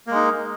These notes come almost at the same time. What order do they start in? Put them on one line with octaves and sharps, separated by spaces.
A#3 G#3 D#4